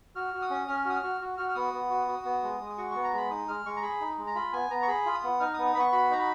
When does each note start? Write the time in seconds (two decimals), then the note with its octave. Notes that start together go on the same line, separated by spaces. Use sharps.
0.16 F#4 F6
0.34 F#4
0.42 D#6
0.50 C#4
0.68 C#4 F6
0.85 F#4 D#6
0.94 F6
1.03 F#4
1.21 F#4
1.37 F#4 F6
1.49 F6
1.55 B3 D#6
1.74 B3
1.90 F#4
2.07 F#4
2.25 B3
2.43 G#3
2.60 G#3
2.70 D#6
2.78 F#4 C#6
2.91 B3 C#6
3.04 A#5
3.13 G#3 B5
3.31 D#4 D#6
3.48 G#3 F6
3.66 G#3 C#6
3.77 A#5
3.82 G#4 B5
4.01 D#4
4.18 G#3
4.27 A#5
4.35 F4 B5
4.53 B3 G#5
4.70 B3 A#5
4.83 C#6
4.88 G#4 B5
5.06 F4
5.14 D#6
5.23 B3
5.40 D#4 F6
5.54 D#6
5.58 B3
5.66 D#6
5.75 B3 B5 C#6
5.92 F#4 B5
6.11 D#4 A#5
6.19 B5